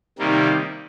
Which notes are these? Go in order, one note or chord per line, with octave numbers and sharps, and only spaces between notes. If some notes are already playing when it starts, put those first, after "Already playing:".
C3 D#3 G3 A#3